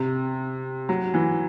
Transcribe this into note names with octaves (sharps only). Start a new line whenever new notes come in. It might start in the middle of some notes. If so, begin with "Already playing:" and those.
Already playing: C3
F#3
E3